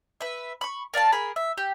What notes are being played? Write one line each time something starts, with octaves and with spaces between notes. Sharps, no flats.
B4 E5
B5 C#6
A#4 D5 F5 A5
G#4 A#4 B5
E5
G4